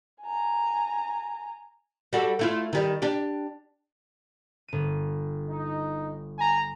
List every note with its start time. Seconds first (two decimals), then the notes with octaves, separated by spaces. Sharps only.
0.23 G#5 A#5
2.13 G3 F#4 A4
2.39 A3 E4 F4
2.73 D#3 G3
3.02 D4 G4
4.68 G1 D#7
5.49 D#4
6.39 G#5 A#5